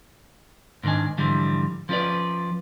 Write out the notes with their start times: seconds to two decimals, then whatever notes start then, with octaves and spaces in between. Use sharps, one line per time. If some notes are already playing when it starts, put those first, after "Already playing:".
0.83 G#2 D#3 F#3 D4 G#5
1.18 G#2 D3 E3 F3 G3
1.89 F3 C#4 F4 B4 D5